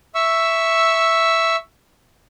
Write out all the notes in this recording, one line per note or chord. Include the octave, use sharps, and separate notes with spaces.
E5 C#6 E6